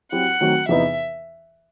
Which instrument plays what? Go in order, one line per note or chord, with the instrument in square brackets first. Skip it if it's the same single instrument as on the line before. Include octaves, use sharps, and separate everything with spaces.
[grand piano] F#3 C4 E4 G4 [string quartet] F#5
[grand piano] D#3 F#3 A3 C4 F#4
[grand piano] E2 C3 E3 B3 D#4 [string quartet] E5